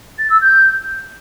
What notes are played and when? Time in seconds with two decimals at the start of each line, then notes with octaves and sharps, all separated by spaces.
0.18 A6
0.30 E6
0.41 G6